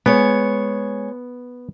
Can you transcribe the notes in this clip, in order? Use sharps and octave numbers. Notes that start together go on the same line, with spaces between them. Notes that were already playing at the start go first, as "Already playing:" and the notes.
G#3 B3 C#5